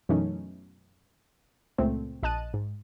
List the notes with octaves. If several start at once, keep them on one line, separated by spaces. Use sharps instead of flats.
F#2 B2 E3 A3 C#4 D#4
C#2 A#2 A3 C4
A#1 D#5 A5 F#6 D#7
G#2